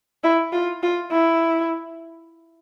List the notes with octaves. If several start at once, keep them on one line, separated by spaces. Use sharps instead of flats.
E4
F4
F4
E4